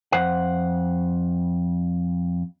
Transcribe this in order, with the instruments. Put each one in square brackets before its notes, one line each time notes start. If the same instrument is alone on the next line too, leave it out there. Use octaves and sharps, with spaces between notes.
[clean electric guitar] F2 C5 F#5